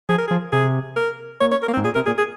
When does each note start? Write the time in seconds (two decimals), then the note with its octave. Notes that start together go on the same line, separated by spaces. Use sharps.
0.09 F3 G#4
0.18 A#4
0.28 G#4
0.31 F3
0.53 C3 G#4
0.96 A#4
1.41 A#2 C#5
1.52 C#5
1.63 A#4
1.68 A#3
1.74 C4
1.77 G#2
1.84 A#2 G#4
1.95 C3 A#4
2.06 A#2 G#4
2.18 G#4